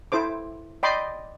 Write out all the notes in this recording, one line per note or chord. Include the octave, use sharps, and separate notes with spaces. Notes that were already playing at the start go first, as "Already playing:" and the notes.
E4 A4 C5 D6
D5 D#5 G5 B5 C6 D6